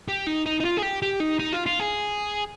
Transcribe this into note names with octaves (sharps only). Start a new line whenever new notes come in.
G4
D#4
D#4
D#4
F4
G#4
G4
G4
D#4
D#4
F4
F4
G#4